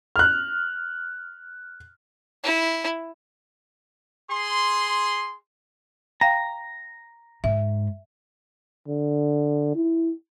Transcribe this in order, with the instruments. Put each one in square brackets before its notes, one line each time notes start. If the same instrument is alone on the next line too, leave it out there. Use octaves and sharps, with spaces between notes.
[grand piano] F6 F#6
[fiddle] E4
[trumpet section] G#4 C6
[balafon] F5 G5 [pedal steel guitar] A#5
[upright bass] G#2 [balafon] E5
[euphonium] D3
E4